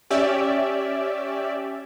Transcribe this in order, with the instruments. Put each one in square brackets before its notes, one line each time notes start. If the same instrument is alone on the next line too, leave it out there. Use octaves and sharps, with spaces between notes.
[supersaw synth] C#4 G4 D5 E5